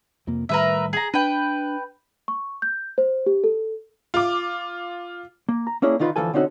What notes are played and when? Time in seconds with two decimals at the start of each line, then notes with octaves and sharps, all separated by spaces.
0.27 F2 C3 A#3
0.49 A2 D#3 G3 A#4 B4 E5
0.93 G#4 A#5
1.14 D4 B4 G5
2.28 C#6
2.62 G6
2.98 C5
3.26 G4
3.44 A4
4.14 F4 D6
5.49 A#3
5.67 A#5
5.82 A#3 C#4 D4 E4 G#4
5.99 D3 D#3 D#4 F4 B4
6.16 D2 C#3 E3 F3 A4 G#5
6.33 D3 C4 C#4 D#4 F#4 A4